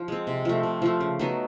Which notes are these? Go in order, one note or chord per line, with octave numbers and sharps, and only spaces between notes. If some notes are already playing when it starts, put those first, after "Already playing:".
Already playing: F3
G#3 C4
C3
F3 A3
C3
F3 A3
C#3
F#3 B3 D#4